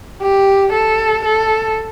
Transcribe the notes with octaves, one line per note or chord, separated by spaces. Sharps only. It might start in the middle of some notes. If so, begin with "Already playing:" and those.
G4
A4
A4